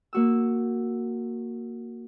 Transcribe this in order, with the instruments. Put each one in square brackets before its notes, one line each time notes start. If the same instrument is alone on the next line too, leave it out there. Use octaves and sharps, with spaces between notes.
[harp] A#3 F#4 E6